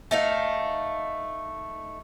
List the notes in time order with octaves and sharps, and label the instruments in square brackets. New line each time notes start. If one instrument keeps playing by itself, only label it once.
[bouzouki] A3 D#4 F5